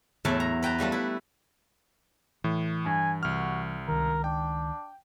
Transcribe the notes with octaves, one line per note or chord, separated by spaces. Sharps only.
E2 A2 F#3 A3 E5 A5
A#5
B4 G5 A5 A#5
F3 G3 A3 D4
E4 B4
A2 E3
G2 G#5
C2 F#4 F6
C#2 D#3 A#4
D4 G5